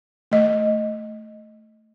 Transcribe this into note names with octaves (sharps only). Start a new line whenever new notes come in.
A3 D#5